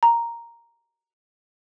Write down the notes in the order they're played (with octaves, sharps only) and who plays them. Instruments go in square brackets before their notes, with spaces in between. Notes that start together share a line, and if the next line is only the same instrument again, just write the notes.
[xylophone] A#5